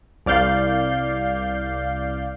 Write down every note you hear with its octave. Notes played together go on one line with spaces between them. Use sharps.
C2 D5 F5 G6 C7